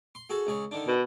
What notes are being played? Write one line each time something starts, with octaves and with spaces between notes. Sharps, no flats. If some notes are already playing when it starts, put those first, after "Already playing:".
C6
F#4 G#4 A4
C#2 G#4 C#5
D3 D#3 D4
B2